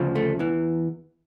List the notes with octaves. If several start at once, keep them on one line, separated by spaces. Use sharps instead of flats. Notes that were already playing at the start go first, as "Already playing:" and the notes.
Already playing: D2 C#3 F3
A3
E2 E3